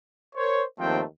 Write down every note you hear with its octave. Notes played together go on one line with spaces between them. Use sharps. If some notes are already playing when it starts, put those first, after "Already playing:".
A#4 C5 C#5
D#2 F3 A3 C4 G5